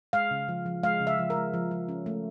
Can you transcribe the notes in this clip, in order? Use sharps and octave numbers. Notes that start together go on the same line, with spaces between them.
G#3 F5
C#3
F3
F3
G#3 F5
C#3
E5
F3
A#4
G#3
F3
F3
C#4
A3